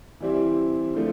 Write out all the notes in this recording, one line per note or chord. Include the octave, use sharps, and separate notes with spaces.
E3 G3 C4 E4 G4
D3 F3 A3